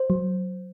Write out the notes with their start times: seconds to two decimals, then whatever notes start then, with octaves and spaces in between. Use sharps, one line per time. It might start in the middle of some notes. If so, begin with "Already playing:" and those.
Already playing: C5
0.10 F#3